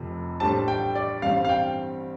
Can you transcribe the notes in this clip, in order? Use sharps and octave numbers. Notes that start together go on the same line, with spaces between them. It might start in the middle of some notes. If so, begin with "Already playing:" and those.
Already playing: F1 F2 C3
A2 G3 D4 G4 C5 A5
G5
D5
A1 G2 G3 C4 F5
F5
G5